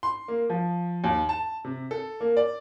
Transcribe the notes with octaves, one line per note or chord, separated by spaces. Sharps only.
C6
A#3
F3
D#2
A5
C3
A4
A#3
D5